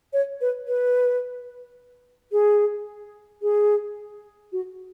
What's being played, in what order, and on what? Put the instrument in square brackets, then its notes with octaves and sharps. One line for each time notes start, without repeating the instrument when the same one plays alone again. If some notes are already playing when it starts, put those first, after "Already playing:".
[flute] C#5
B4
B4
G#4
G#4
F#4